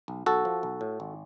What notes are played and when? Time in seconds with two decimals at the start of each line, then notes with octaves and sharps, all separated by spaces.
0.08 B1
0.26 B1 F#4 A4
0.45 F3
0.63 B1
0.81 A2
1.00 G#1